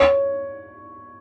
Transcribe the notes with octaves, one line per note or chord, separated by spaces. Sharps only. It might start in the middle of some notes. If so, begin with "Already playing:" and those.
Already playing: C#5